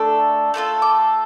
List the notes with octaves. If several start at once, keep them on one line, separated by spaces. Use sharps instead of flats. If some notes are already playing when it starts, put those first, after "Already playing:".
Already playing: A3 D4 A4
A3 D4 F4 A4
D6